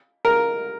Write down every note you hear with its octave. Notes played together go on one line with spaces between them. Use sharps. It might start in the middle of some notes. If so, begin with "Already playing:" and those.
A#4